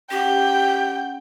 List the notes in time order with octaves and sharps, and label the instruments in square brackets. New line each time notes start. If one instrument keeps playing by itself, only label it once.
[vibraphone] C#4 F#5 [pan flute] G4 [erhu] G5